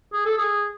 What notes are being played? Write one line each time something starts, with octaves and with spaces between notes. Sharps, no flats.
G#4
A4
G#4